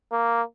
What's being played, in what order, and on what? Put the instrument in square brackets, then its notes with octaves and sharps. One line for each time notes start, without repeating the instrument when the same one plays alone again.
[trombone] A#3